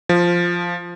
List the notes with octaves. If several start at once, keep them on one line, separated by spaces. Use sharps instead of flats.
F3